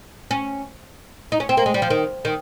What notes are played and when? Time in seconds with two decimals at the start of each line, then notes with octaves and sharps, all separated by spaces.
0.31 C#4
1.32 D#4
1.40 C#4
1.49 C4
1.57 A#3
1.66 G#3
1.74 G3
1.82 F3
1.90 D#3
2.25 D#3